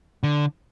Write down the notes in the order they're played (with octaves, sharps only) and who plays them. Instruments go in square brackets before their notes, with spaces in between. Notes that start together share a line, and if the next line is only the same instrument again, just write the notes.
[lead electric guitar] D3